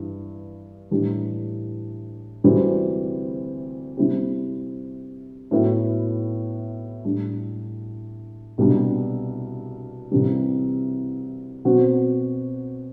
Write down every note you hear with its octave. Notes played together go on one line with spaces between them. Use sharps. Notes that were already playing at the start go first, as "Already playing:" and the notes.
Already playing: G2 E3
A2 E3 G3 D4 G4
D2 C3 E3 G3 C4
C3 G3 C4 E4 G4
A2 F#3 B3 E4
A2 G3 D4
C2 B2 G3 D4
C2 C3 E3 G3
B2 F#3 C4 F#4